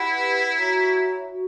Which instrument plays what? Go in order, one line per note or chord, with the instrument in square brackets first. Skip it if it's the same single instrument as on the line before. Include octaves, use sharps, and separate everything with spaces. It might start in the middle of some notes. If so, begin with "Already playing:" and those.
Already playing: [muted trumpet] E4 [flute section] G4 B4 F#5 B5
[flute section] F#4 C#5 E5 A#5
F#4